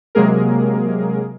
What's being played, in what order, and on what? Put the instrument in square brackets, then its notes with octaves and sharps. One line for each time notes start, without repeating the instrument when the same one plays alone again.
[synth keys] C3 F#3 G#3 A#3 G#4 A#4